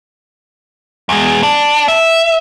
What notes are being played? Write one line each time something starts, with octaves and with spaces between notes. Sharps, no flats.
E2 G#3
D4
E5